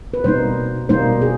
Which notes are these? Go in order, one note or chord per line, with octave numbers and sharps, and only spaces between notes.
B4
B2 G3 A#3 D#4 C5
B2 G3 A#3 D#4 C5
G#4